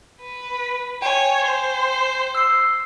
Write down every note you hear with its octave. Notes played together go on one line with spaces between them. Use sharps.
B4
C#5 G5 G#5
C5
E6 C7